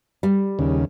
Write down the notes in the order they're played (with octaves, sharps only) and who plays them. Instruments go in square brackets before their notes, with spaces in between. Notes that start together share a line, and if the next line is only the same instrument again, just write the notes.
[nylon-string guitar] G3
[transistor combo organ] D#2 C#3